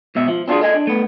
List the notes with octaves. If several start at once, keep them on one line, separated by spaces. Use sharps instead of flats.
G#2 B2 E5
F3
C4 D4 F4 F#4 G#4
A4 D#5 G#5
D4
A3 B3